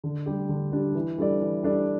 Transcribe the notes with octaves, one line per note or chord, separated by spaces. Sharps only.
D3
G3 D4 G4
D3
G3 D4 G4
E3
G3 D4 A4 D5
E3
G3 D4 A4 D5